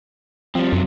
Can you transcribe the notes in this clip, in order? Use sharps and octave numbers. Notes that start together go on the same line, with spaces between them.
F3 G3 C4
F#2 C3 F#3